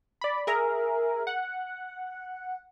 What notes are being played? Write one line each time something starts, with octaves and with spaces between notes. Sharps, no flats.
D5 B5
G#4 A#4 E5
F#5